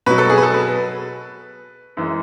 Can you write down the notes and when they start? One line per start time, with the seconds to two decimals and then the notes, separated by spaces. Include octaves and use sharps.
0.06 B2 F#3 B4
0.18 A4
0.30 G#4
0.38 B4
0.43 A4
0.54 B4
1.97 F#2 E3 G#3